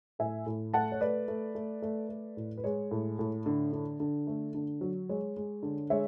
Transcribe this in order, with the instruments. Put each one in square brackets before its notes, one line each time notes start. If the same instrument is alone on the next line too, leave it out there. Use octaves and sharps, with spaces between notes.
[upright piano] A2 E5 G#5
A2
A3 F#5 A5
C#5
A3 B4 D5
A3
A3
A3
A3
A2
B4
G#3 C#5
A2
A2
D3
D3
D3
A3
D3
F#3
G#3 C#5
G#3
D3
G#3 C#5 E5